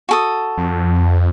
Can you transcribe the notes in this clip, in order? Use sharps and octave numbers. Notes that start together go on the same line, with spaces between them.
F#4 A4 D#6
F2